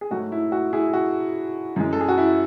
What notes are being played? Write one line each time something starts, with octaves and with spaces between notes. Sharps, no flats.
G#4
G#2 F#3 A3 F#4
E4
F#4
E4 G#4
F#4
F#2 E3 G#3
A4
G#4
F#4
E4